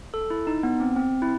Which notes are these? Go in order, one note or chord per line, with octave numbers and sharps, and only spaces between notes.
A4
E4
D#4
B3
C4
C4
E4